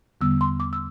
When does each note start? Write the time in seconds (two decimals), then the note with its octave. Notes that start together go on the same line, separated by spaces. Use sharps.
0.21 E2 D3 G3 B3 E6
0.41 C6
0.60 D6
0.73 E6